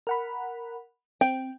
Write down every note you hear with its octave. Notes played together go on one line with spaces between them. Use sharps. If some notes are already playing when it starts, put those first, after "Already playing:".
A#4 F#5 B5
C4 G5